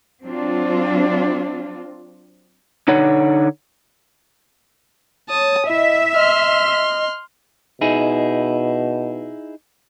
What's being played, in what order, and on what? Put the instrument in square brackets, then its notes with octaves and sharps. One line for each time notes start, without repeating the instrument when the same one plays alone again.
[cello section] F#3 C4 D4 F4
[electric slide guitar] D3 D#4 C#5 F#5
[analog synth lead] C#5 [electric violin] A5 D#6
[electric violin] E4 [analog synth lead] D#5 [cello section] E5
[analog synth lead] D#5 [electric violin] C6 F6
[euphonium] B2 [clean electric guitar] D#4 E4 G#4